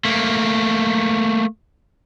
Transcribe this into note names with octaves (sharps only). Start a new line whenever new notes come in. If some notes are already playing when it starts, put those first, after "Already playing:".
A3 A#3